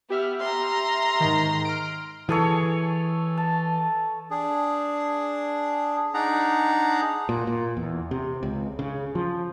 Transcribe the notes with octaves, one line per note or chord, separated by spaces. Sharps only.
B3 G4 E5 F6
A#5 C6
G#2 D#3
F6 D7
E3 G#4 A4 C#5
A5
D4 G#4
D4 D#4 G#4 D5 F#5 A#5
A#2
A#2
E2
C3
C#2
C#3
F3